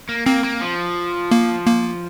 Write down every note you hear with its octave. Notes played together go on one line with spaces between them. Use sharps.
A#3
A#3 C4
A#3
F3
A#3
A#3